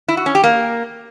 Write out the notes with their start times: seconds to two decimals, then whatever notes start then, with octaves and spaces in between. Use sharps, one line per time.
0.08 E4
0.17 F#4
0.26 C#4
0.35 G4
0.44 A#3